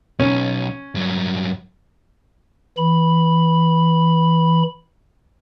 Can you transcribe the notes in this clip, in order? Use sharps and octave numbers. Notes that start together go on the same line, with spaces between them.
B1 C#4
G2 F#3
E3 B5